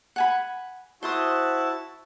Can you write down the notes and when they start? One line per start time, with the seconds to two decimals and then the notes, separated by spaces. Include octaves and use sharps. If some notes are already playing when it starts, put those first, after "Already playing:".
0.16 F#5 G#5 B5
1.03 E4 F#4 C5 A5 C6 D#6